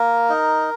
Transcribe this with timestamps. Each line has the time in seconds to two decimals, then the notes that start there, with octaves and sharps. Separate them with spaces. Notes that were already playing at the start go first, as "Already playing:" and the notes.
Already playing: A#3 A#4
0.29 D#4